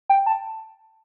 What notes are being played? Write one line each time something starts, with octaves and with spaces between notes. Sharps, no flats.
G5
A5